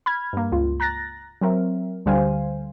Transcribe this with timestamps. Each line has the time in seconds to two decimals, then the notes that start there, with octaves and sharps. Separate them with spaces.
0.06 B5 F6 G#6
0.33 G2 A#3
0.52 C#2 F4
0.80 A#5 F#6 A6 A#6
1.41 F#3 C4 A#4 E5
2.06 D2 D3 G3 C5 F5 G#5